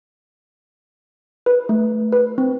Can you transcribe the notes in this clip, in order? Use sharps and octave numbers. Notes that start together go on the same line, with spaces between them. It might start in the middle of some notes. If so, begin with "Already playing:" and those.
B4
A3
B4
C4